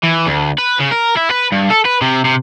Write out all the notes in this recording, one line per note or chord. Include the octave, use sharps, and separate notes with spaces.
E3
D2
B4
C#3
A#4
E4
B4
G2
A4
B4
C3
C3